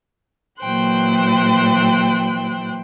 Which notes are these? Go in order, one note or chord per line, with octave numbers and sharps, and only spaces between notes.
A#2 E3 F#3 C5 G5 F#6